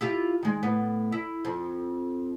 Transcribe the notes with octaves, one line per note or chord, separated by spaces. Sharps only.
E4 F4 G4
D#3 G#3
A2 B3
E4
F2